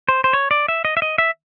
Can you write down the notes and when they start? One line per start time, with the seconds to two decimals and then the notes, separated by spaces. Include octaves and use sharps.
0.09 C5
0.24 C5
0.33 C#5
0.51 D5
0.68 E5
0.85 D#5
0.97 E5
1.02 D#5
1.18 E5